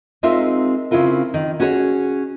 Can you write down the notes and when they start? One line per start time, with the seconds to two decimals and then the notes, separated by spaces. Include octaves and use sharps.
0.23 G#3 C4 D#4 F4 A#4 E5
0.91 C#3 C4 E4 F4 A#4
1.34 D#3
1.60 C#4 F#4 G#4 B4 C#5